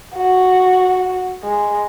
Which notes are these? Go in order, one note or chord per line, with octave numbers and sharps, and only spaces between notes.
F#4
G#3